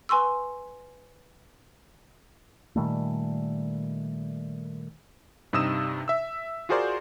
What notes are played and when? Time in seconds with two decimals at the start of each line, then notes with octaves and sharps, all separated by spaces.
0.09 B4 G#5 C6 C#6 E6
2.76 A#2 D#3 G3 A3
5.53 G2 C3 D#4 D#6 E6 E7
6.08 E5 E6
6.69 F4 F#4 G#4 A#4 C5 D5